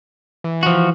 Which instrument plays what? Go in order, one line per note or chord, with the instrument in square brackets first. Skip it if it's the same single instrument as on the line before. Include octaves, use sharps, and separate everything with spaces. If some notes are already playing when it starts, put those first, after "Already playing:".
[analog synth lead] E3
[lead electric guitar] F3 F#4